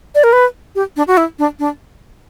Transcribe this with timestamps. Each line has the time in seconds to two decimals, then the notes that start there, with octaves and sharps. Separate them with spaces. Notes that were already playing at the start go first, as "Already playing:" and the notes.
0.15 D5
0.24 A#4
0.33 B4
0.75 G4
0.96 D4
1.07 F#4
1.17 E4
1.39 D4
1.59 D4